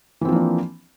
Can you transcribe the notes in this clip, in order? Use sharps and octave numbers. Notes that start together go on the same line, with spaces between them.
E3 F3 A#3 C4 D4